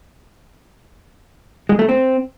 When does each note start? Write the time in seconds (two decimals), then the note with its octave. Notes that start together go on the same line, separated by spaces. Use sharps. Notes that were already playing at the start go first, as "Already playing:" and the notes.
1.69 G#3
1.79 A3
1.89 C4